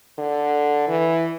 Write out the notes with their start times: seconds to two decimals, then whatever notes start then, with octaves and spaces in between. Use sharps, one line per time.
0.18 D3
0.88 E3